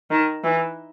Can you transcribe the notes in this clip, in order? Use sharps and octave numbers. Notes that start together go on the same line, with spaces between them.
D#3
E3